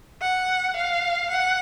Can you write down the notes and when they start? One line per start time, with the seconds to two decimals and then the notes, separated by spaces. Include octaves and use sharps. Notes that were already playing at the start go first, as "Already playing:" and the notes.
0.22 F#5
0.76 F5
1.30 F#5